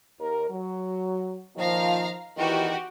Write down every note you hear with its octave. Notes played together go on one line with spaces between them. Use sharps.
D#2 A#4
F#3
A#2 D#3 F3 F5 A#5
E2 D#3 E3 F#4 G4